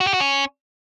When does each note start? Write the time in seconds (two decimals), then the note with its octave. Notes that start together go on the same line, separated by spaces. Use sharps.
0.01 F#4
0.07 G4
0.14 F#4
0.20 C#4